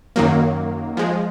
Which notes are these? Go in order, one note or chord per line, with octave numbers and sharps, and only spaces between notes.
F#2 D#3 F#3 A#3
F3 G#3